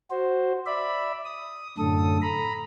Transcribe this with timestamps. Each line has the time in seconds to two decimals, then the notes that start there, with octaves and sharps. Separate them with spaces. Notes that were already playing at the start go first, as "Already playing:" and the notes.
0.10 F#4 C5
0.66 D5 E5 B5
1.25 D#6
1.78 F#2 A2 D3 A4 D#6
2.22 A#5 B5